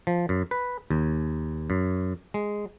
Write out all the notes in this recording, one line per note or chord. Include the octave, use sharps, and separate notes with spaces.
F3
F#2
B4
D#2
F#2
G#3